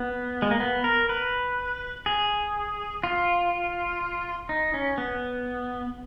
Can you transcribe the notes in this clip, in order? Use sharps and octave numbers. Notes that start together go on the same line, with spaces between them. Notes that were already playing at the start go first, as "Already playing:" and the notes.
Already playing: B3
G#3
A#3
B3
A#4
B4
G#4
F4
D#4
C#4
B3